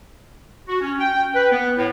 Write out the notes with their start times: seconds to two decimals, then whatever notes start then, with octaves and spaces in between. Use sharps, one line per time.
0.68 F#4
0.81 C#4
0.99 G5
1.34 B4
1.51 B3
1.77 A2